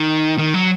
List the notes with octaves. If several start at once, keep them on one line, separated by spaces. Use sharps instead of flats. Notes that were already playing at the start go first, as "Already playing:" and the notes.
Already playing: D#3
D#3
F#3